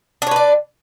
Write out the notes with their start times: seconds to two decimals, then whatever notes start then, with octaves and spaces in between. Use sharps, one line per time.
0.22 D4
0.27 C#5
0.31 B4
0.36 D5